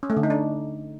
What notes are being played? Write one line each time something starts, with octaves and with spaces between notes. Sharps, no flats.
C#4
A3
D3
D#4
D4